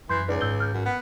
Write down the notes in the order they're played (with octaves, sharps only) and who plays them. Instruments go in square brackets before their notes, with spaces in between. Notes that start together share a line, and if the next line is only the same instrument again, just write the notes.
[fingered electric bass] F#2 [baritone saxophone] E3 [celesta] C6 G6 C7
[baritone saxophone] C#2 [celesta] D#4 B4 D5
[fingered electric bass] G#1 G#2 [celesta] E6 G6 G7
[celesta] F6 G6
[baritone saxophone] F#2
B3